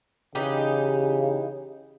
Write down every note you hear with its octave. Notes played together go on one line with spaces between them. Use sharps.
C#3 E3 D#4 G4